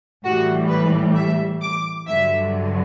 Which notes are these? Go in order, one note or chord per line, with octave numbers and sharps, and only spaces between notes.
A2 E3 G3 F#4
B4
E5
D6
G2 D3 F#3 E5